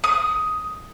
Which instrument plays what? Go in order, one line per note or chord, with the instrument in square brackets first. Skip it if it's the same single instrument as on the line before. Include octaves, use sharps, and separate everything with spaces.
[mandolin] D#6